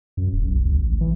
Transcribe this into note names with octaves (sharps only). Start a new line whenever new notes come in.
F#2
D1
B1
C#2
A1
E3